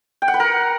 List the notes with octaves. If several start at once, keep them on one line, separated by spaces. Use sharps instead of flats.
G5
F#5
B4
A#4